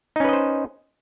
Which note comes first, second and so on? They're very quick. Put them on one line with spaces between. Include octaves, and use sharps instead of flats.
D#4 C#4 B4 D#5 C5